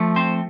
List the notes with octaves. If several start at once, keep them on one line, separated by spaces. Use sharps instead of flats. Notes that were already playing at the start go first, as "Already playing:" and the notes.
Already playing: F3 A3
C4 C5